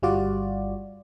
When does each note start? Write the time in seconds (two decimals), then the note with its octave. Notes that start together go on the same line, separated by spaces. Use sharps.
0.02 G1 G3 F4 F#4 D5